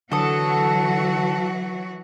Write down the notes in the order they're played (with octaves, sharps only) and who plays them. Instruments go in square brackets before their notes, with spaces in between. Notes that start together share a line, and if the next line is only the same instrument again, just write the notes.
[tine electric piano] D3 [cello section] E3 F#3 F#4 [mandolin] A4 D#6